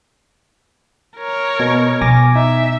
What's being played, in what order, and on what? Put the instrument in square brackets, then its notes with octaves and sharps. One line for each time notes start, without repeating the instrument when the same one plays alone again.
[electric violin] A#4 C#5
[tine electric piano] B2
[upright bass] B2 [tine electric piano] G#5 D6 A#6
[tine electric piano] D#4 [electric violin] E5